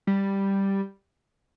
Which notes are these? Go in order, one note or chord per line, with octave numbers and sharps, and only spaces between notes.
G3